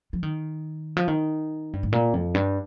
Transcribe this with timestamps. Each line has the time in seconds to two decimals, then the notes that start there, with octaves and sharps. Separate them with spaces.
0.13 F3
0.23 D#3
0.97 F3
1.08 D#3
1.73 G2
1.83 G#2
1.92 A#2
2.14 F2
2.34 G2